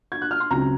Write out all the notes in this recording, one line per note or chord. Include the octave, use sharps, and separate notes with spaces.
G#6
F#6
F6
C6
C#2 C#3 F#3 C4 A#5